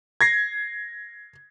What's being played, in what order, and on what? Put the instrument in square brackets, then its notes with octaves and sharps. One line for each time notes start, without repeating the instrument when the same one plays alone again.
[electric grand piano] G#6 A#6 C7